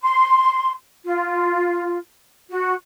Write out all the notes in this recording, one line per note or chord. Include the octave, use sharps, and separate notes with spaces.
C6
F4
F#4